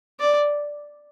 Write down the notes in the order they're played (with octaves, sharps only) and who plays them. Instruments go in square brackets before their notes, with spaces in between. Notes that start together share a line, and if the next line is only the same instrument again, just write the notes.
[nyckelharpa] D5